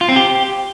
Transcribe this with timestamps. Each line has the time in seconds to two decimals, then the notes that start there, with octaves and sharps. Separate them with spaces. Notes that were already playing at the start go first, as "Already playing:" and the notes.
0.01 F4
0.09 C4
0.16 G4